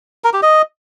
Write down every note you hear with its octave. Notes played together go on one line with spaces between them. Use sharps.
A#4
G4
D#5